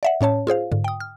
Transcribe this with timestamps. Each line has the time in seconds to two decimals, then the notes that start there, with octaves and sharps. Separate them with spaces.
0.03 D5 E5 F#5
0.21 A2 C#4 C#5 A5
0.47 F4 G#4 C5 F5
0.72 G#2 D3
0.84 G5 D#6
1.00 F6